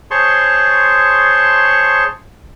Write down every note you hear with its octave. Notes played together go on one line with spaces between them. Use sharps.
G#4 C5 C#5 A5 C6 C#6